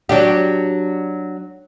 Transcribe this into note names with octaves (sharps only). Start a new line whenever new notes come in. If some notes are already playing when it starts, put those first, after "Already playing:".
F#3 D4 G4